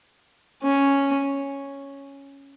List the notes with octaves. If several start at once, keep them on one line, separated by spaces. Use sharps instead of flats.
C#4